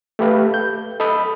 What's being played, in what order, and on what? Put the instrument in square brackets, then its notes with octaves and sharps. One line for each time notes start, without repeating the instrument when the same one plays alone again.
[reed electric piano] A3 G4 B4 F5
G6
A4 D#5 B5 D#6